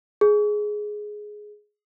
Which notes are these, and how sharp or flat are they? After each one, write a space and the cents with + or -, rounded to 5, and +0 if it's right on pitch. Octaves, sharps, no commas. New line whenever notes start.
G#4 +10